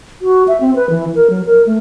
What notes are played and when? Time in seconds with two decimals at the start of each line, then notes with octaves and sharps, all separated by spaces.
0.22 F#4
0.48 E5
0.61 C4
0.76 B4
0.90 E3
1.15 A#4
1.30 F#3
1.46 A#4
1.66 A3